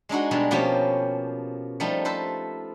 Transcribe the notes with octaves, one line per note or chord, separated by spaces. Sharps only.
G#3 D4 D#4 F#4
B2 G3 G#3 D4
B2 F3 A#3 C#4 G4
F3 G3 A3 D#4
A4 B4 C5